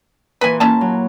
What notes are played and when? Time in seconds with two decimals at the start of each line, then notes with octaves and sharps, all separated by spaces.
0.41 A#2 E3 B4 G#5
0.60 A#3 C#4 E4 A5
0.81 F#3